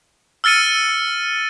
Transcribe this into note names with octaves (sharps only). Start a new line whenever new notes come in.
E6 F6 A6 C#7 D#7